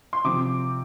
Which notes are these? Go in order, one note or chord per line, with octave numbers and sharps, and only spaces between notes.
C6
C3 F3 C4 D6